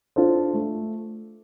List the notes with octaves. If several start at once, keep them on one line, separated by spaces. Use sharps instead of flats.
D4 F4 A4 C5
A3